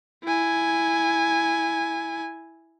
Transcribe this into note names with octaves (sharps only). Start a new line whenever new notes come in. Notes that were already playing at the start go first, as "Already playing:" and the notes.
E4 G#5